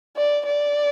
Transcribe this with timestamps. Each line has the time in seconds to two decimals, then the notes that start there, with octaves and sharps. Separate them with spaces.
0.17 D5
0.45 D5